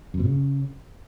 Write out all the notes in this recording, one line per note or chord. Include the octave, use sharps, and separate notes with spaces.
F#2
B2
C#3